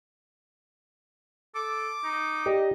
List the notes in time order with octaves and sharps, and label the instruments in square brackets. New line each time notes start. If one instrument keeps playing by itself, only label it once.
[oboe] A4 [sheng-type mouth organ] D6
[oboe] D#4
[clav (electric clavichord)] G4 D5 [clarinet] D#5